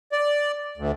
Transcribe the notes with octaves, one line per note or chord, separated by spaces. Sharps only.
D5
D2